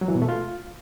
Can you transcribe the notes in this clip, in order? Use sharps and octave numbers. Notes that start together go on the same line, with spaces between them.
F#3
E3
B2
A3
F4